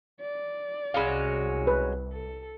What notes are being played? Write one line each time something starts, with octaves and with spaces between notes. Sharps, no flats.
D5
C2 F#3 G#3 C#4 F5 B5
B4
A4